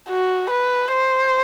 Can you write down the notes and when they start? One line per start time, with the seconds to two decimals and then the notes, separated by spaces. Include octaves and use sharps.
0.10 F#4
0.50 B4
0.92 C5